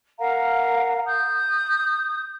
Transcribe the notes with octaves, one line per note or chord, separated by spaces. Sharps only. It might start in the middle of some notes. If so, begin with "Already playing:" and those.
A#4 F5 F#5 A#5
D#6 G6